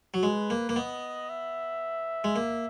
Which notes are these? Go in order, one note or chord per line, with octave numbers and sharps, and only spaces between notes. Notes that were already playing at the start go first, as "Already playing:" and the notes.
F#3
G#3 B4
A#3
A#3
B3 D#5
E5
G#3
A#3